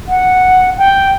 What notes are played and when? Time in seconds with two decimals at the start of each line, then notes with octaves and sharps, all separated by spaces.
0.08 F#5
0.78 G5